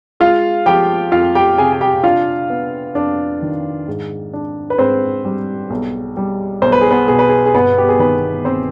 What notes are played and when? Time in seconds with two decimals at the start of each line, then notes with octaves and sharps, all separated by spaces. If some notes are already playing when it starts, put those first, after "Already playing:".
0.20 G#3 F4 F5
0.66 F3 G4 G5
1.12 F2 F4 F5
1.35 G4 G5
1.58 C3 G#4 G#5
1.72 G#5
1.81 G4 G5
2.03 D4 F4 F5
2.50 B3
2.95 F2 D4 D5
3.42 D#3
3.88 G#2
4.33 D4
4.70 B4
4.78 G#2 C4 C5
5.25 G3
5.70 B1
6.17 G3
6.62 B1 C5
6.72 B4
6.81 G#4
6.91 B3 B4
7.08 B2 G#4
7.19 B4
7.29 G#4
7.46 G#4
7.54 G1 B3 B4
7.78 G4
7.89 G#4
7.99 D#3 B3 B4
8.45 C4 C5